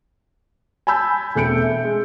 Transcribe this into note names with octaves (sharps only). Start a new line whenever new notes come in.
G#5 A5 B5 E6 G6
E1 A3 C4 G6 C#7 D7
E5
G#3